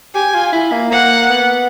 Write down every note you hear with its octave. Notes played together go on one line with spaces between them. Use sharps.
G4 G#5
F4
E4
A#3
A#3 F#5
B3